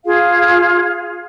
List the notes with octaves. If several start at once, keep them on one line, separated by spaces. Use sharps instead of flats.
F4 G#4 F5